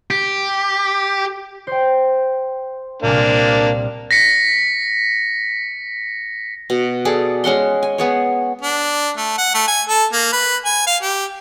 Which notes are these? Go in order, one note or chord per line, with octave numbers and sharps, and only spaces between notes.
G4
C5 G5
C2 A#2 A#3 D4
A#6 B6 C#7
B2
G#4 A4 D5
G#3 C#4 F#5 C6
G#5
B3 G#4 C#5
D4
A3
F#5
A3
G#5
A4
A#3
B4
G#5
F5
G4